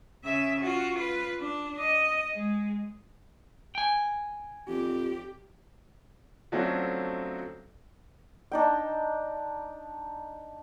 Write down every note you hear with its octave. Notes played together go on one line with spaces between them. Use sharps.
C#3 E5
F4 F#4
F4 B4
D4
D#5
G#3
G5 G#5
F2 G4
D3 F3 F#3 A3 C4 C#4
D4 D#4 G5